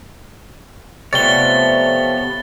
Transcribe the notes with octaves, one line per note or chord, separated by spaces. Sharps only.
C3 F3 G3 A3 B3 C#5 A6 G7